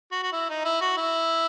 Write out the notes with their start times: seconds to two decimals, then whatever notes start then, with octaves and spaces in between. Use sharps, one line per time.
0.11 F#4
0.23 F#4
0.32 E4
0.49 D#4
0.64 E4
0.81 F#4
0.97 E4